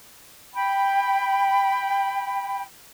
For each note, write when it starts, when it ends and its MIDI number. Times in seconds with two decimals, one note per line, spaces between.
0.54 2.63 79
0.54 2.63 83